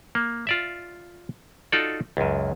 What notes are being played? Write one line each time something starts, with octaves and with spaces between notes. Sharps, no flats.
A#3
F4 D5 E5
D#4 F4 F#4 A4 D5
C#2 F#2